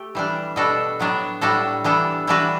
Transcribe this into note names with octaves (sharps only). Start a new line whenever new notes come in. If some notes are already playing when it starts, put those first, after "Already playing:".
Already playing: A3 G4
E3 G3 D4
B2 G3 D4 F#4 A4
A2 F#3 B3 D4
A2 G3 D4 F#4 A4
E3 G3 B3 D4 A4
E3 G3 D4 F#4 B4